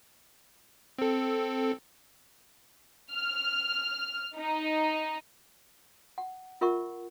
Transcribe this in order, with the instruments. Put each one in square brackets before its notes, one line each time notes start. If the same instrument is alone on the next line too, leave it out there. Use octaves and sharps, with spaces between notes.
[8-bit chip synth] C4 A4
[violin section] F6
D#4
[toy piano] F#5
F4 A#4 E5 F#5 C#6